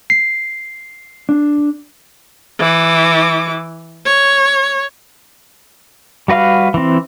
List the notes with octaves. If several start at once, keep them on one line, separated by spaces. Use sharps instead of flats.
C7
D4
E3 D6
C#5
G3 F#4 B4 F5 F6
E3 C4